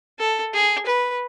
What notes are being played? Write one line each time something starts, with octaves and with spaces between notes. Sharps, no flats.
A4
G#4
B4